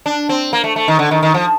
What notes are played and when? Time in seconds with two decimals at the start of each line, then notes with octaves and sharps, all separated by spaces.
0.06 D4
0.29 C4
0.53 A#3
0.64 A3
0.76 A3
0.88 D#3
0.99 D3
1.11 D#3
1.23 D#3
1.34 F3